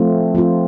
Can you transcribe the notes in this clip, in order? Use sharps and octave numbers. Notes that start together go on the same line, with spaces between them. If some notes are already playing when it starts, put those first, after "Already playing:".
Already playing: F3 A3 C4 F4
F3 A3 C4 F4